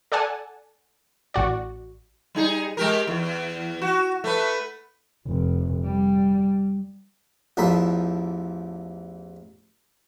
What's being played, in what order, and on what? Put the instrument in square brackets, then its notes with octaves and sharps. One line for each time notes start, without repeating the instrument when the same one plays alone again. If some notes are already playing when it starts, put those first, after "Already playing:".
[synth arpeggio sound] A4 D5 F#5 G#5 A5
A1 F#4 D5
[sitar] G3 D#4 G#4
G#3 G4 A#4
E2
F#4
A3 B4
[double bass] F1
G3
[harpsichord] A1 E2 F3 D#4 A4 B5